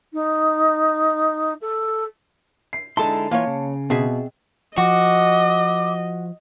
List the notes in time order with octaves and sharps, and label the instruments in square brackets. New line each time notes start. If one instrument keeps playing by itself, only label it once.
[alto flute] D#4
A4
[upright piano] C7
[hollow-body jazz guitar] D3 A4 C6 [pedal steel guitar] G#3 D#4 E4 [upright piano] A5
[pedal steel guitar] E3 F4 [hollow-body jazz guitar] A#3 C#5
[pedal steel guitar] C#3
[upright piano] B2 [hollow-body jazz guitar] C4 G#4 E5
[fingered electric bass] F3 [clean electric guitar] F#4 [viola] D#5 [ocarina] D6